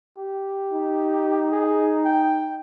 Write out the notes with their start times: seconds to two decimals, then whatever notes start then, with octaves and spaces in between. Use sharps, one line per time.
0.18 G4
0.72 D#4
1.52 G#4
2.05 G5